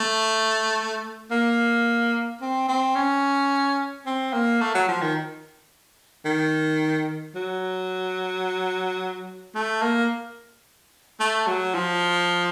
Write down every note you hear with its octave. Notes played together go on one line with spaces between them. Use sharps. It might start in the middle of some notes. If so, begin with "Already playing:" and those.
Already playing: A3
A#3
C4
C4
C#4
C4
A#3
A3
F#3
F3
D#3
D#3
F#3
A3
A#3
A3
F#3
F3